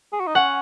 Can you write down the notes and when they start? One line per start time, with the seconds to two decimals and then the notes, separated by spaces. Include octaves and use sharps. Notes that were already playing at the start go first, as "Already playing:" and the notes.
0.13 G#4
0.20 F#4
0.27 D#4
0.35 C#4 F#5